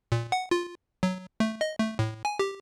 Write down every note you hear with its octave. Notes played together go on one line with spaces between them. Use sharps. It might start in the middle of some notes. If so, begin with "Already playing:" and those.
A#2
F#5
F4
F#3
A3
D#5
A3
A2
G#5
G4